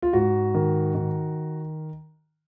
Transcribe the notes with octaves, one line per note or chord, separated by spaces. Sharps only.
F4
G#2 F#4
D#3
D#3